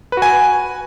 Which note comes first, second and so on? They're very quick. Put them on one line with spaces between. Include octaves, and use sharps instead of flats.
B4 F#4 G#5